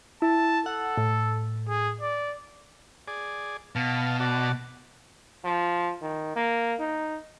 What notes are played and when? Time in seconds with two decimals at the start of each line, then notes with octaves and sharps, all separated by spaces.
0.22 E4 A5
0.66 A4 F#5
0.98 A2
1.69 G#4
2.01 D5
3.08 G#4 D5
3.75 B2 F5 A5
4.20 F#4 D5 A5
5.45 F3
6.02 D#3
6.36 A#3
6.80 D#4